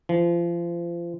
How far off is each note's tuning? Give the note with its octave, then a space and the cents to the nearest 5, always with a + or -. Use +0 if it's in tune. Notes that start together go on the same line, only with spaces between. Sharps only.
F3 -30